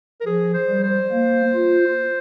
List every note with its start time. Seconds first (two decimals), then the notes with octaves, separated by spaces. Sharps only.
0.21 A#4
0.26 F3 G#4
0.54 C5
0.69 G3
0.83 C5
1.12 A#3
1.55 F4